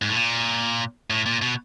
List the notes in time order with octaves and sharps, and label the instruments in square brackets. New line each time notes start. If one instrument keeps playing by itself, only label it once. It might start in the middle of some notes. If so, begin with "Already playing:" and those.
[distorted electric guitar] G#2
A2
A#2
A2
A#2
B2